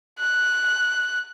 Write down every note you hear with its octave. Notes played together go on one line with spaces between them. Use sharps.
F#6